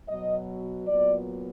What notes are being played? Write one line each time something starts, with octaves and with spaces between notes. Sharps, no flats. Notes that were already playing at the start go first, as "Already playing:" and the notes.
B2 F#3 B3 D#5
A#2 F#3 B3 D5